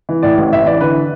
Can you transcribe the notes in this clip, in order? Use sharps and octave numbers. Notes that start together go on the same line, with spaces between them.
E3
A2 D5
A1
A1 E5
E3 D5
D3 B4